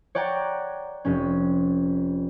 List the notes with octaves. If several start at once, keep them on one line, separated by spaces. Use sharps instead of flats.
C#5 D5 F#5 G5 A#5
F1 C#4